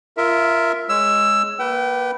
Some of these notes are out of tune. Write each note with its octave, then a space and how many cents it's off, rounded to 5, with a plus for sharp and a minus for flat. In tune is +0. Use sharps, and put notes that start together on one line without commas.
F4 -20 A#4 +0 E5 +0
G#3 +0 C#5 +0 E6 +15
A#3 +20 B4 +0 G5 -30